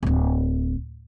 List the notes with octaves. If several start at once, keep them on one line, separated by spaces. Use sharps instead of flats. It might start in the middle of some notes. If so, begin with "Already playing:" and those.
D1 G#1